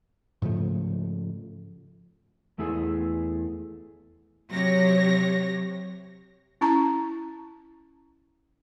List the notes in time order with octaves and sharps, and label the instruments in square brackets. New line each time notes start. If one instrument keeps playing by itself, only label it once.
[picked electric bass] G#2 C#3 F3 A3
[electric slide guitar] E2 A3 E4 G#4
[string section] C3 F#3 G4 C#5 A#6
[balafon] C#4 E4 A5 A#5